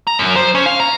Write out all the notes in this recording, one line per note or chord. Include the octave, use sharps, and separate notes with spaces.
A#5
F#2
C5
C#4
F5
A#5